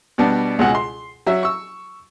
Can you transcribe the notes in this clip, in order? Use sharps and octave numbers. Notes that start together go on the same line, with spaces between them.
B2 G3 B3 D4
C#2 B2 F#5 G#5
C6
F#3 F#4 E5
C#6 E6